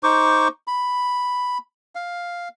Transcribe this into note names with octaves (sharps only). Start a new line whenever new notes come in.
D#4 C5 C#6 D6
B5
F5